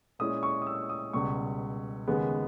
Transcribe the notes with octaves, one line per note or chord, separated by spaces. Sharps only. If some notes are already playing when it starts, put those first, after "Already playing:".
A#2 G#3 C#4 E4 D#6
C#6
D#6
E6
D#6
C#2 B2 G3 C#6
D#2 C#3 G#3 B3